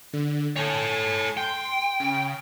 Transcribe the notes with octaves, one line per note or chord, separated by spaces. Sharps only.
D3
A4 C#5 G#5 A5
G5 C6
C#3